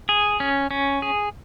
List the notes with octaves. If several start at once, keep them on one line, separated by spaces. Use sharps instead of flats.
G#4
C#4
C#4
G#4